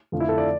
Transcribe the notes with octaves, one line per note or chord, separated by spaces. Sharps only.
F2 D3 F3 A3
E4
A4
D5